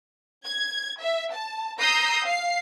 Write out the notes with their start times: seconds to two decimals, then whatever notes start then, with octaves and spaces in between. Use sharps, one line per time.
0.44 G#6
1.01 E5
1.33 A5
1.79 A#5 D#6 E6 G6 A#6 C7
2.26 F5 C7